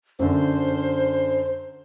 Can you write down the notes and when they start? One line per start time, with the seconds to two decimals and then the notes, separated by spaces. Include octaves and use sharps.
0.19 F#2 D3 C5